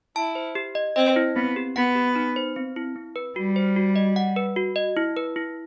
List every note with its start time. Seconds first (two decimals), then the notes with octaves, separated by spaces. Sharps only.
0.15 E4 A5
0.35 C5
0.55 G4
0.75 D#5
0.96 C4 D#5
1.16 E4
1.35 B3 C4
1.56 G4
1.76 B3 F#5
1.95 G4
2.16 D#4
2.36 C5
2.56 C4
2.76 E4
2.96 C4
3.16 B4
3.36 G3 F#4
3.56 C5
3.76 F#4
3.96 D#5
4.16 F#5
4.36 B4
4.56 F#4
4.76 D#5
4.97 E4
5.17 B4
5.36 E4